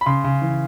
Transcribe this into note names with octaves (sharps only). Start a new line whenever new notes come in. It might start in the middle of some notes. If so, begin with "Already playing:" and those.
B5
C#3 C6
C#3
E3